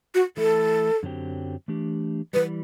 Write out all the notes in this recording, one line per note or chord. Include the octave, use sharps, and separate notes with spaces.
F#4
E3 A3 E4 A4
F#2 D3 F#3 C4 G4
E3 A3 D4 G4
E3 G3 B4